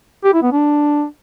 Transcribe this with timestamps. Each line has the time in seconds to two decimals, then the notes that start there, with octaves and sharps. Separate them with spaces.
0.24 G4
0.34 E4
0.43 B3
0.52 D4